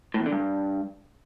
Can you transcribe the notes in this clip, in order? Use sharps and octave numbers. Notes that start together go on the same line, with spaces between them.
A2
E2
D3
G2